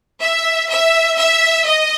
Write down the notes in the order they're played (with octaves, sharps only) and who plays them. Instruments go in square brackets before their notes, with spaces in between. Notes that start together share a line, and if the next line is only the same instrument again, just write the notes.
[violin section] E5
E5
E5
D#5